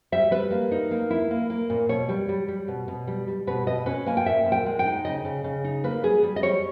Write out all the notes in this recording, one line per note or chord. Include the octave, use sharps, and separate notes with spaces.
G3 E5
G3 B4
A#3
D#4
A#3
E4
A#3
A#3
A#2
B2 C#5
G3
G3
G3
B2
B2
G3
G3
B2 B4
B2 D#5
C#4 B4
A#3 G#5
G5
A#2 E5
A#2
G5
G#3
G5
D#4
C#3 D#5
C#3
C#3
D#4
A#3 B4
G3 G#4
G3
D#5
G3 C#5